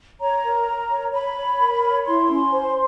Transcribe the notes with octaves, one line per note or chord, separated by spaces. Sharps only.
C#5 A#5
A#4
A#4
C#5
C#5 B5
C#5
A#4
C#5
E4 C6
C#4
C5